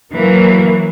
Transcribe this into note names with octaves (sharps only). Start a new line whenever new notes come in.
E3 F#3 A#3